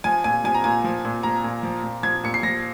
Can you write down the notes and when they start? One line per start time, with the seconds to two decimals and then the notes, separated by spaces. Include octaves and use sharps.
0.04 F3 G#5
0.24 A#2 G#5
0.44 F3 G#5
0.54 A#5
0.64 A#2 G#5
0.84 F3
1.05 A#2
1.23 F3 A#5
1.44 A#2
1.63 F3
1.84 A#2
2.03 F3 G#6
2.24 A#2 C#7
2.34 C7
2.43 F3 A#6